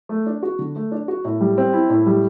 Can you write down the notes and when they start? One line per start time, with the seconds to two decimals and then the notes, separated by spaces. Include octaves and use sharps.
0.09 A3
0.26 D4
0.42 F#4
0.59 D3
0.76 A3
0.92 D4
1.08 F#4
1.25 A2
1.41 G3
1.58 C4
1.73 E4
1.90 A2
2.06 G3